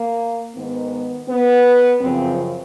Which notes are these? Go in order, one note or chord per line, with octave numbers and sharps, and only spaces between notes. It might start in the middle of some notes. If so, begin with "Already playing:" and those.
Already playing: A#3
G#2 D#3 B3
B3
F#2 C#3 F3 C4